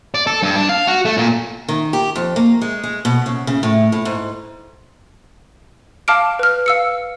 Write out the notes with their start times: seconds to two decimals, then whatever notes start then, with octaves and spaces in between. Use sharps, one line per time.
0.14 D5
0.27 A4
0.43 G2
0.56 D4
0.69 F5
0.87 F#4
1.05 A3
1.17 A#2
1.68 D#3
1.93 G4
2.16 F2
2.36 A#3
2.62 G#3
2.84 G#3
3.05 B2
3.26 C#3
3.47 C#3
3.63 A2
3.92 A2
4.05 G#2
6.08 F5 A5 D6 F6 D7
6.39 B4 F6
6.66 F5 E6 C#7